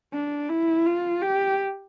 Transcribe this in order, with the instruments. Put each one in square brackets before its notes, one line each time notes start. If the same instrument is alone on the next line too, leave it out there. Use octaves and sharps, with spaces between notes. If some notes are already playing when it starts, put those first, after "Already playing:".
[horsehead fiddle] D4
E4
F4
G4